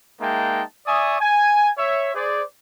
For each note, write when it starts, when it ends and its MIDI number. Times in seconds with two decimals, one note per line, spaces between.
0.20 0.62 56
0.20 0.62 58
0.20 0.62 63
0.20 0.62 76
0.20 0.62 79
0.20 0.62 81
0.86 1.17 74
0.86 1.17 76
0.86 1.17 80
0.86 1.17 85
0.86 1.17 87
1.19 1.69 80
1.77 2.13 73
1.77 2.13 76
2.14 2.42 68
2.14 2.42 72
2.14 2.42 74